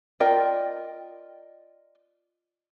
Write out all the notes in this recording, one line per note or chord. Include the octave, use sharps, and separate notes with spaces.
F4 A#4 D5 D#5 G5